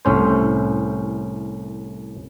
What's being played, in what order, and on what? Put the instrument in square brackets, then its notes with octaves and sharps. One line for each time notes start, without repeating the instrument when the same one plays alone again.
[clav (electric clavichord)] C2 A2 C#4 C5